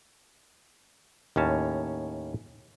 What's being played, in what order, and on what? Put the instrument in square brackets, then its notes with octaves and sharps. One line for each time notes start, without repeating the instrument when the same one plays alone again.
[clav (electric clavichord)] D#2 A2 C#4 A5